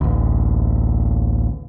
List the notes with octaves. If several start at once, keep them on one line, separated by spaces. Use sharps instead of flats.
A1 D2